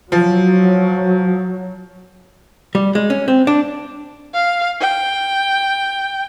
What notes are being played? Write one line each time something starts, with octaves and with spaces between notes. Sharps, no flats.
F3 F#3
G3
G#3
C#4
C4
D4
F5
G5